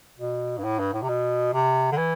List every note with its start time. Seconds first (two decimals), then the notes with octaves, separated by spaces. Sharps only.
0.19 B2
0.58 G2
0.64 A2
0.79 G2
0.93 A2
1.02 C3
1.08 B2
1.53 C3
1.92 D3
1.97 E3